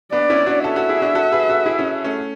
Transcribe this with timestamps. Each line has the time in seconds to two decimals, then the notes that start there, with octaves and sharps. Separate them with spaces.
0.12 B3 D4 D5
0.30 C#4 E4
0.46 D4 F#4
0.64 F#4 A4 E5
0.76 F#4 A4
0.89 E4 G#4
1.02 D4 F#4
1.15 F#4 A4
1.32 G#4 B4
1.50 F#4 A4
1.66 E4 G#4
1.79 C#4 E4
2.04 A3 C#4